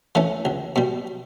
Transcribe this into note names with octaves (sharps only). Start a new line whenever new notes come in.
E3 A3 C#4
C#2
B2 G3